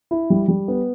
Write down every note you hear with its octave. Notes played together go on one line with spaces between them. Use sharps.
E4
G3
G3
B3